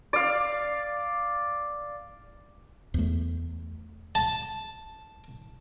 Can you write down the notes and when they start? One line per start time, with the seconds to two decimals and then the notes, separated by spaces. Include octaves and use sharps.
0.13 D5 F5
2.94 E2 A3
4.15 A5